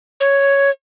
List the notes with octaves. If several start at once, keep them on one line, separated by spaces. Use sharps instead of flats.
C#5